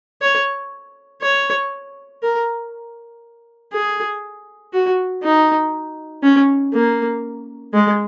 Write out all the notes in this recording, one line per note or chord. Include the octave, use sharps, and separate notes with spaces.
C#5
C#5
A#4
G#4
F#4
D#4
C#4
A#3
G#3